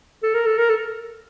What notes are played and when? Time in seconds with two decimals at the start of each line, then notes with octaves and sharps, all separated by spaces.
0.23 A4
0.35 A#4
0.47 A4
0.58 A#4
0.70 A4